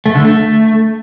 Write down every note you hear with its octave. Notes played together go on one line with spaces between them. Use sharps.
A3
D3
A3